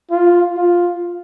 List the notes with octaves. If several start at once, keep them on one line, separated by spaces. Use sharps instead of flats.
F4
F4